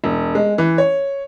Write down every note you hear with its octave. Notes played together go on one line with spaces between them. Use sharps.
E1
G#3
E3
C#5